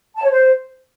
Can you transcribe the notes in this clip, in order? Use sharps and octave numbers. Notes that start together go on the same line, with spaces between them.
A5
C#5
C5